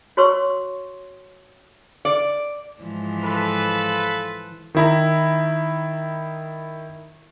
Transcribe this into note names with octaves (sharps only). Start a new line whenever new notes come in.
F#4 C#5 C6 C#6 E6
D5
G#2 E3 F3
F4 A4 B4
D#3 E4 A#5